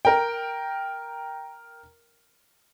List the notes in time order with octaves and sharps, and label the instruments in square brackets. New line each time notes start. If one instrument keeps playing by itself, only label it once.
[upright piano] A#4 G5